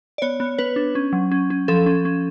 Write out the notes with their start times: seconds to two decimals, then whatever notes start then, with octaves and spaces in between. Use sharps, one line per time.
0.18 D5
0.22 B3 C#5
0.40 B3
0.58 B3 B4
0.76 D4
0.95 C#4
1.13 F#3
1.32 C#4
1.50 C#4
1.68 F3 A4
1.86 C#4
2.05 C#4